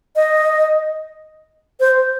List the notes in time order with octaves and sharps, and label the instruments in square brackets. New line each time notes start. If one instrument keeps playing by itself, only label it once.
[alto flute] D#5
C5